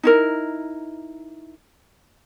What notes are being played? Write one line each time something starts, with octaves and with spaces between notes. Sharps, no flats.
D#4 E4 A#4